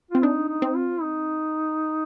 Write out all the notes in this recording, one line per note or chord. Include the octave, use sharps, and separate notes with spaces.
C4 F4
D4 D#4
D#4
C4
F4
D#4